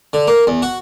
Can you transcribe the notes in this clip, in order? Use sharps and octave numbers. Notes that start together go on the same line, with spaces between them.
D3
A#3
E2
F#4